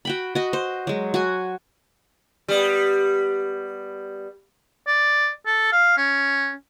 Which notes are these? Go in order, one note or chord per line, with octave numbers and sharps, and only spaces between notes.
F#4 G5 B5
F#4 D#5
C5
F#3 G#3
F#4 G#5
G3 B3
D5
A4
F5
C#4